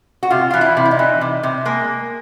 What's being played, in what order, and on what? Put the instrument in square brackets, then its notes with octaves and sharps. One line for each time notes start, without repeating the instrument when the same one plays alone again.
[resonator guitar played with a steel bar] F#4
C3 F4
E3 F4
E4
C3
E4
D#4
E3
C3
C3
G#3 A#3